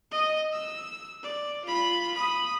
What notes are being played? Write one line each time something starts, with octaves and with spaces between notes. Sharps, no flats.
D#5
E6
D5
F4 B5
B5 D#6